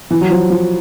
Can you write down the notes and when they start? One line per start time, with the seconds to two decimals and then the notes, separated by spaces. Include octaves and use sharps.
0.11 E3
0.21 F#3
0.31 F3
0.50 F3